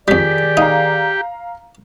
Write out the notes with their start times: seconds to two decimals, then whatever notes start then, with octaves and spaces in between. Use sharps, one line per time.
0.08 F2 D#3 G3 G4 G#4 D5 B6
0.57 D#4 F5 A#5